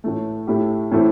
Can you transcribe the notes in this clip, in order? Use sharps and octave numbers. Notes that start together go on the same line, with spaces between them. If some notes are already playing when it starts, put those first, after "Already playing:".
A2 E3 A3
A2 A3 E4 G4
A2 E3 A3 C4 E4